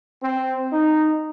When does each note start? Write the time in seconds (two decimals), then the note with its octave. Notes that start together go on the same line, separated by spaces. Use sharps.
0.22 C4
0.73 D#4